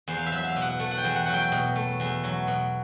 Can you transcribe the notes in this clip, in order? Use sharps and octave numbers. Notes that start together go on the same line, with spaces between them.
E2 C5
F5
E5
F#3
E5
F5
B2
F#5
A3 F#5
F#5
G5
E2
F#5
F#3 F#5
G5
B2
A3
E2
F#3
B2